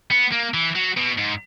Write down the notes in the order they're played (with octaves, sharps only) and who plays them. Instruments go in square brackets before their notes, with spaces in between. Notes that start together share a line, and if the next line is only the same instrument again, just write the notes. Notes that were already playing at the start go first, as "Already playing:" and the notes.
[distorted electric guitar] B3
A#3
E3
F#3
B2
G#2